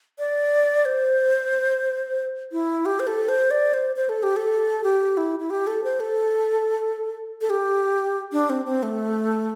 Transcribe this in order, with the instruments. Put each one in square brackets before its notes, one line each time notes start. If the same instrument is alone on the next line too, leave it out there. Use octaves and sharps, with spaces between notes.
[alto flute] D5
C5
E4
G4
C5
A4
C5
D5
C5
C5
A4
G4
A4
G4
E4
E4
G4
A4
C5
A4
A4
G4
D4
C4
C4
A3